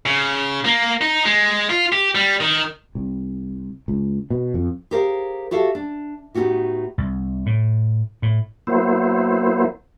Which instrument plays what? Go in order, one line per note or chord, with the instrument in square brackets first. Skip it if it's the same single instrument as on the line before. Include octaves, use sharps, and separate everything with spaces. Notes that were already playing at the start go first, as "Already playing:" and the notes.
[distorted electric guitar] C#3
A#3
D#4
G#3
F4
G4
G3
D#3
[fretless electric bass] C2
C#2
B2
F2
[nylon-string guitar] G4 G#4 A#4 C5 F5
F#4 G4 A4 E5 F5
D4
A2 B3 C#4 D#4 F#4 G4
[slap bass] C2
A2
A2
[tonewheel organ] F#3 A#3 B3 E4 C5